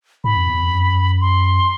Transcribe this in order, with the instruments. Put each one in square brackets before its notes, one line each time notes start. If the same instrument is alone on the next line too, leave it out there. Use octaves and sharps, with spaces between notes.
[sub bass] G#2 [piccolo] B5
[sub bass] F2
E2
F2
F#2
[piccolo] C6